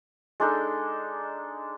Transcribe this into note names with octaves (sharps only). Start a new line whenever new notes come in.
G#3 D4 D#4 A4